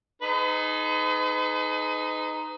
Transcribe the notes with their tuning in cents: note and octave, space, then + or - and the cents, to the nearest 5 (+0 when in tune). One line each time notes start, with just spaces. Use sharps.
D#4 +0 G#4 +40 B4 +45